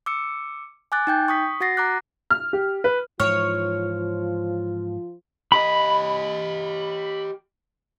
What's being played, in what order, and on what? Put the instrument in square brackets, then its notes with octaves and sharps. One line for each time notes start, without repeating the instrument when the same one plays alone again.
[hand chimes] D6 E6 C#7
G#5 D6 F#6 A6
D#4 G5 G6
C#6 D#6 B6
F#4 F#5 A6 A#6 C7
A#5 D6 F#6
[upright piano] F6
G4
B4
[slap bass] G#2 E3 [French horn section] F3 F4 [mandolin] C#5 [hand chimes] F6
[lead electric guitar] G4 D#5 [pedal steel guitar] B5